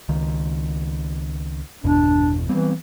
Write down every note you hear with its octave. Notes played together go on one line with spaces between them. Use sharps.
C#2 D#3
G1 E2 B2 D4
E3 G3 B3 C4